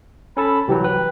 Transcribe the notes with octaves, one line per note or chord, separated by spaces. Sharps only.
C#4 A4 A5 B5
C2 E3 F#3 G4
B4 G5